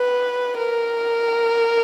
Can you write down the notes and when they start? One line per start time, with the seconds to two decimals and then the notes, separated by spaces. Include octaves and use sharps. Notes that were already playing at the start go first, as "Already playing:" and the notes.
Already playing: B4
0.58 A#4